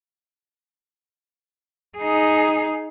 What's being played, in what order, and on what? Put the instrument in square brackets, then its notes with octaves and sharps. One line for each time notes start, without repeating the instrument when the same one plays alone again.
[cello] D#4 G#4